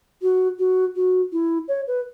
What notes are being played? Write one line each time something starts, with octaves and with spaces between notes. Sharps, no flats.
F#4
F#4
F#4
E4
C#5
B4